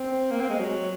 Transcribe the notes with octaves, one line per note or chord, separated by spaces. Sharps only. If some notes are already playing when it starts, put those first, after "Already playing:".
Already playing: C4
A#3
C4
G#3
F#3